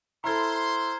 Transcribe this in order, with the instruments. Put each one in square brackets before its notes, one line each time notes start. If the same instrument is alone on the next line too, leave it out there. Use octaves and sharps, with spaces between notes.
[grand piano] E4 A4 [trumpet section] C5 C6 [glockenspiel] A#5 F6 G#6